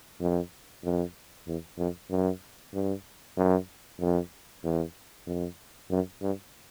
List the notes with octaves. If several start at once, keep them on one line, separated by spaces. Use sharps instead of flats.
F2
F2
E2
F2
F#2
G2
F#2
F2
E2
F2
F#2
G2